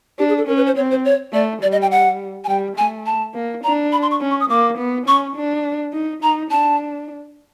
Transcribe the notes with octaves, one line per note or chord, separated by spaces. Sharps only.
D4 G4
G#4
A4
C#4 A#4
B4
C5
C4 C#5
C5
C#5
A3 D5
G3 D5
D#5
G5
F#5
G#5
G3 G5
A3 G#5
A5
A#3
D4 A#5
B5
C6
C#6
C#4
C#6
D#6
A#3 D6
B3
C#4 C#6
D4
D#4
D#4 A#5
D4 A5